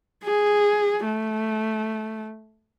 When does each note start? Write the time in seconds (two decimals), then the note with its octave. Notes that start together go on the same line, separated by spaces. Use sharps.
0.24 G#4
1.04 A3